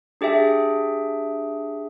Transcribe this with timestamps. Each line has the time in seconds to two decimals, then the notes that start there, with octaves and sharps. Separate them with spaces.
0.21 D4 G4 G#4 E5 G5